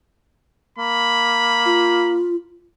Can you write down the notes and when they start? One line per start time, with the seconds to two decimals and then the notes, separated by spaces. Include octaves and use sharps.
0.78 A#3 B5
1.66 F4